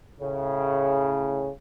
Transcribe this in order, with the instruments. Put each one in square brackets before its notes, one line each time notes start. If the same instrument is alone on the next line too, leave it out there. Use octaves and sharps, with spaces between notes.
[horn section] A2 C#3